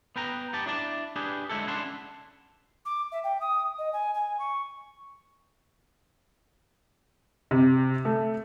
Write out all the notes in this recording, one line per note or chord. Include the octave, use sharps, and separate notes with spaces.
B3 B4 G5 A#5
B3 G4 A5
D4 E4 D5 A5
D4 G4 G#4 B4
D3 G#3 D#4 E4 A4
C#4 D4 E4 F#5 A5 C6
D6
E5
G5
D#6
D#5
G#5
G#5
C#6
C3
A3